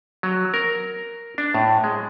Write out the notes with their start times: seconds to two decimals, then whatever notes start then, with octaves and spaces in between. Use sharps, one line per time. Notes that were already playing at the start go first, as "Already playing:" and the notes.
0.23 F#3
0.54 A#4
1.38 D4
1.54 A2
1.84 G#3